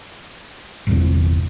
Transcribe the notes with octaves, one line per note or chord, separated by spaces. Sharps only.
G1 E2 C3